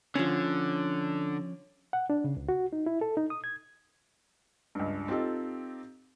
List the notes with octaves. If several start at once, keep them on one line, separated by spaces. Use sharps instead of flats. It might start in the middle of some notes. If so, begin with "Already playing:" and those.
D3 F3 C#4
F#5
D4
C#3
C#2
F#4
D#4
E4
A4
D#4
D#6
G#6
C#2 G2
C4 D#4 F4 G4 A4